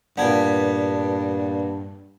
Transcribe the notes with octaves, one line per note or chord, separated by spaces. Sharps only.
G2 A#2 B3 D5 A5 G#6